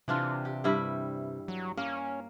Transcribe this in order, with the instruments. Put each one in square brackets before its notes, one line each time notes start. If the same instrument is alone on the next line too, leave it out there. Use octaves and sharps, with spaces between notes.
[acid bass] C3 [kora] E3 D4 F4
[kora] G4
G2 G3 E4
[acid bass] F#3
[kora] A#3 [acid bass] C#4